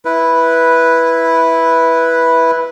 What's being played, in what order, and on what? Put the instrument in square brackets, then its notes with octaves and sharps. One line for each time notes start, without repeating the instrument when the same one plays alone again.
[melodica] E4 B4